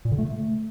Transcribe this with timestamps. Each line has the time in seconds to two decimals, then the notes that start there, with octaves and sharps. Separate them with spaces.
0.05 A#2
0.12 D3
0.18 A3